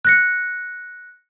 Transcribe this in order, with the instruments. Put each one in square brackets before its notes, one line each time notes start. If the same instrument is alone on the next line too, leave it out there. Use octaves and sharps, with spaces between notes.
[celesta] F#6 A#6 C#7